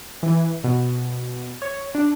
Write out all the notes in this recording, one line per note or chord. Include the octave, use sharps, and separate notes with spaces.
E3
B2
C#5
D4